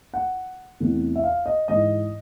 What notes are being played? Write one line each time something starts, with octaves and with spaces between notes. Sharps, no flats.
F#5
E2 C3 E3 A3
E5
F5
D#5
G#2 E3 G#3 D#5